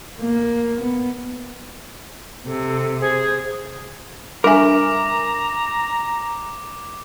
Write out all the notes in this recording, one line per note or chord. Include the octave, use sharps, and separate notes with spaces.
A#3
B3
C3 A4
G#4 C5
G3 D4 A#4 E5 G#5 A#5 D6